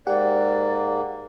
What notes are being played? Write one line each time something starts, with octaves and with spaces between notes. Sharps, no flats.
G#2 A#3 G4 D5 F#5